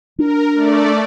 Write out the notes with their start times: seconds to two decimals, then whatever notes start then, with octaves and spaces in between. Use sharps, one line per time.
0.18 D4 A#4
0.55 A3 D5